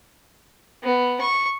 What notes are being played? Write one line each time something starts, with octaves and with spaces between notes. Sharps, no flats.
B3
C#6